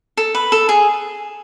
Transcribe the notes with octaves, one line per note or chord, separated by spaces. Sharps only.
A4
B4
A4
G#4